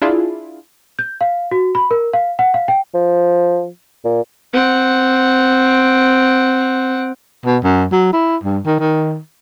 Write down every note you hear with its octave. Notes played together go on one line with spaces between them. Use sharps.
D4 E4 F4 G#4
G6
F5
F#4
B5
A#4
F5
F#5
F5
G5
F3
A#2
C4 F#5
B2
F#2
F#3
E4
G2
D#3
D#3